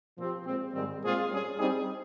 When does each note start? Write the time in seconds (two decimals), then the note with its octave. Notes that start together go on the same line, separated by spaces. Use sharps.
0.17 A#2 F3 C4 G4
0.45 A#2 G#3 C4
0.74 G#2 D#3 G3 C4
1.02 A#2 G#3 C4 F4 G#4
1.30 G3 C#4 G#4
1.58 G3 C4 D#4 G#4